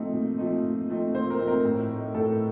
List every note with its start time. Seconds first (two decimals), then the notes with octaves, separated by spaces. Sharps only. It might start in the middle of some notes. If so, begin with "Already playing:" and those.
Already playing: A#2 F3 A3 C4 D#4
0.13 A#2
0.38 F3 A3 C4 D#4
0.63 A#2
0.89 F3 A3 C4 D#4
1.14 A#2 C5
1.30 A#4
1.39 F3 A3 C4 D#4
1.47 A#4
1.65 A2
1.90 A3 D#4
2.14 A2 A4